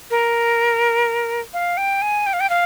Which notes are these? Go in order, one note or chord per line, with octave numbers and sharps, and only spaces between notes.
A#4
F5
G5
G#5
G5
F5
G5
F5